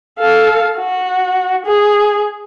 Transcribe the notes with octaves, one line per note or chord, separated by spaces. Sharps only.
A4 F5
F#4
G#4